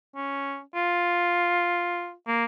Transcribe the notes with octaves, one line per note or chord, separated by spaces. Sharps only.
C#4
F4
A#3